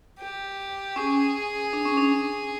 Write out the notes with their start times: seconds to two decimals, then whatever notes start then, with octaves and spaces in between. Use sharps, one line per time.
0.20 G4
0.96 C#4 G#4
1.73 D4
1.86 C#4
1.97 D4